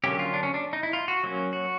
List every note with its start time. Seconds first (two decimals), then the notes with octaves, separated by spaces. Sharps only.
0.04 D3 F#3 A#3 C#4 G4
0.19 F4
0.33 D4
0.43 C#4
0.54 D4
0.73 D#4
0.83 E4
0.93 F4
1.08 F#4
1.23 F#3 A#3 C#4
1.53 F#4